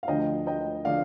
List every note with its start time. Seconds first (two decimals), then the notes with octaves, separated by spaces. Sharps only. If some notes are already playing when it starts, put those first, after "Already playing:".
0.03 F5
0.08 D2 D3 F3 D#5 G5
0.47 D#5 G5
0.85 D3 F3 D5 F5